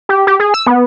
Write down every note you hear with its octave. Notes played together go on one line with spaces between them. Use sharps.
G4
G4
G#4
E6
B3